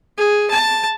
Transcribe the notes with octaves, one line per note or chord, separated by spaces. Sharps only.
G#4
A5